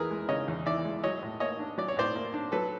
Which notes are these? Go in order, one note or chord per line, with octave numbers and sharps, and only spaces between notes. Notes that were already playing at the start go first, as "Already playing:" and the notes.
Already playing: E2 E3 G#4 A#4 B4
G#3
C#3 C#5 D#5
E2
E3 D5 E5
G#3
F#3 C#5 D#5
A2
A#3 C#5 D#5
D4
F#3 D5
C#5
A2 C5 D5
A#3
D4
F#3 A4 B4